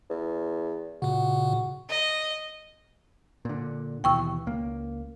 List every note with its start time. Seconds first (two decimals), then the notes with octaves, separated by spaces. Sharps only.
0.10 E2
1.02 A#2 C#3 F#4
1.89 D#5
3.45 A#2 D3
4.04 D#2 B2 E3 G5 C#6 E6
4.46 C#2 A#3